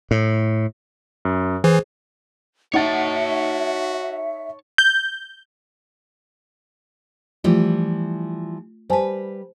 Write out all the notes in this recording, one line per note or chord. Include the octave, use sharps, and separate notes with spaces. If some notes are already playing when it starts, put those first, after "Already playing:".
A2
F#2
E3 G#4 C5
D#4 F#4 C#5 E5 F#5 A5 A6
G6
E3 F3 G3 A3 F4
G3 B4 C5 G#5 A5